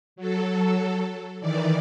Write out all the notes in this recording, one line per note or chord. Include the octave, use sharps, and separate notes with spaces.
F#3 A4
D#3 E3 D5